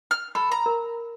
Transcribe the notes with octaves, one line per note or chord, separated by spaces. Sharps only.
F6
A4 B5
A#5
A#4